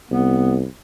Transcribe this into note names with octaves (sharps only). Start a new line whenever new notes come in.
C2 B3